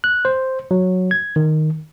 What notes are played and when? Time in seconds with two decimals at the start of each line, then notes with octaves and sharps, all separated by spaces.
0.04 F#6
0.25 C5
0.71 F#3
1.11 G#6
1.36 D#3